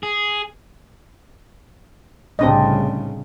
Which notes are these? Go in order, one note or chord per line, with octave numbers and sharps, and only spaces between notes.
G#4
C2 A2 C#3 C4 D4 D#5